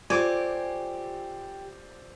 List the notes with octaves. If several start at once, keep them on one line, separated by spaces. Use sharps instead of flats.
F4 G4 A4 C5 D5 G#5 C#6 D6